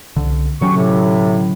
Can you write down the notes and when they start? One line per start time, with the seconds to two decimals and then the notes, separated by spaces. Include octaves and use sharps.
0.16 C2 D3
0.61 D3 F#3 C#4 G4 C#6
0.75 A2 C3